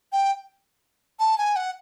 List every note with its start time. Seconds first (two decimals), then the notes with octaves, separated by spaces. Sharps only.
0.12 G5
1.19 A5
1.38 G#5
1.56 F#5